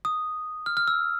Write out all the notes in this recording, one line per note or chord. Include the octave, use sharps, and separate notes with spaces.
D#6
F6
F6
E6